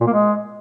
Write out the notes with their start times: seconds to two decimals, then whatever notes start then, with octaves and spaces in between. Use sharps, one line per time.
0.01 A#2
0.07 A#3
0.13 G#3